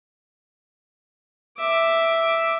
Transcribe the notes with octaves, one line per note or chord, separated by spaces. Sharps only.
E5 D6